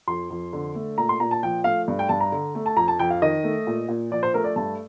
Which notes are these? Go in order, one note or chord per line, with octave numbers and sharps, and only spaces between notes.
F2 C6
F2
D3
A3
A#2 A#5
C6
A#2 A#5
A5
F3 G5
A3 F5
G2
G5
G2 A5
A#5
D3
A3
A5
F2 A#5
A5
F2 G5
F5
D#3 D#5
A3
A#2
A#2
F3 D5
C5
A3 A#4
D5
G2 A5